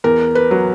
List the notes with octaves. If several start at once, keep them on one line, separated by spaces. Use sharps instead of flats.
E2 A#4
B4
F#3